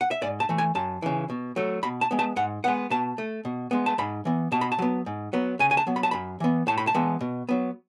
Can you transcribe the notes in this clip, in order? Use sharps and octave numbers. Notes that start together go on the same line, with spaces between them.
F#5
E5
G#2 D5
A5
E3 A3
G#5
F#2 A5
C#3 E3
B2
F#3 A3
B2 B5
A5
G#3 B3
A5
G#2 F#5
G#3 B3 F#5
B2 A5
A3
B2
G#3 B3
A5
G#2 B5
E3 B3
B2 A5
B5
A5
F#3 B3
G#2
F#3 B3
C#3 G#5
G#5
A5
F#3 B3
B5
A5
F#2 B5
E3 B3
A2 A5
B5
A5
E3 G#3 B3
B2
F#3 B3